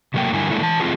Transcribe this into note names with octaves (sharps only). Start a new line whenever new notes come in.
C3 F#3 A3 A#3 G5
G2 D3 G3 E4 A#4 G#5
G#3 A#3 D4 E4 A4
E3 A5
A3 C4 F4 G#4 A4